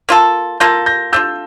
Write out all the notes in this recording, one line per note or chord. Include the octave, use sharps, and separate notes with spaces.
A#3 F4 A4
A#3 F4 A4 G6 A#6
G6 A#6
A3 D4 F4 E6 G6